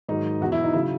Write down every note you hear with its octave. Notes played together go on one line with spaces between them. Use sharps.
G#2 D#3 F#3 D#4
E2 B2 F#3 F#4
E4
D#4
C#3 F#3 E4